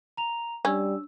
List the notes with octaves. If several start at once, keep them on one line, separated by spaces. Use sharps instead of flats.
A#5 F7
G3 C#4 D4 E6